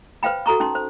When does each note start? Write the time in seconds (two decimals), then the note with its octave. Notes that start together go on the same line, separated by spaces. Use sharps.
0.23 B4 C5 F5 G5 B5
0.46 F#4 A4 A#5 C#6
0.60 C#4 D#4 C6
0.75 C5